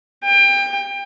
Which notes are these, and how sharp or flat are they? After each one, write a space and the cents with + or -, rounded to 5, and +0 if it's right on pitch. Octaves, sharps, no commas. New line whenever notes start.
G5 +25